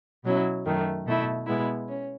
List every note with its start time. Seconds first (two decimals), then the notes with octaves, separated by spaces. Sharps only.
0.23 B2 F#3 C#4 E4
0.64 F#2 D#3 A3
1.05 B2 A3 E4
1.46 B2 G#3 B3 E4
1.88 C#4